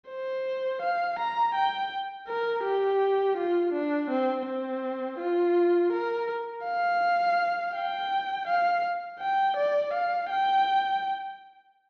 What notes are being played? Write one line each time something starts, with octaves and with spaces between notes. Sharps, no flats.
C5
F5
A#5
G5
A#4
G4
F4
D4
C4
C4
F4
A#4
F5
G5
F5
G5
D5
F5
G5